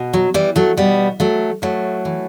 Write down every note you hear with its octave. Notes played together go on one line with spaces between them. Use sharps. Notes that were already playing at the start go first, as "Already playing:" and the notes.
Already playing: B2
F#3
E3 G3
F#3 A3
B2 G3 B3
F#3 A3
A2 F#3 A3
E3